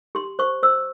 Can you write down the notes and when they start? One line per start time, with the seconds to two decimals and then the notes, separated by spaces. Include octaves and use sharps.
0.15 G4 C6
0.39 C5 C#6
0.63 C5 E6